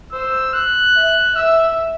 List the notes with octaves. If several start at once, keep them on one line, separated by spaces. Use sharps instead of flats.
C5 E6
F#6
E5
E5 E6